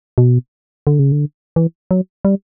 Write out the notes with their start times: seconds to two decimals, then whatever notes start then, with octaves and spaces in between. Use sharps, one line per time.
0.18 B2
0.87 D3
0.99 C#3
1.12 D3
1.56 E3
1.91 F#3
2.25 G3